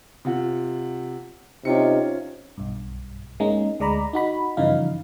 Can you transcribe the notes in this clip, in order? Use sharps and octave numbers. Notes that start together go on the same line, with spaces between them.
C3 F4 F#5
C3 C#4 D#4 F4 C#7
B1 G2
G#3 A#3 C#4 D#4
D2 G#3 D5 A#5 B5
D#4 F#4 B5
G2 C#3 E3 F3 D#4 F5